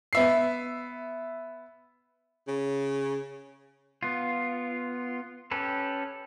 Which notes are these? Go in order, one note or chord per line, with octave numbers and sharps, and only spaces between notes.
B3 E5 C7
C#3
B3 F4
C#4 G4 A4 B4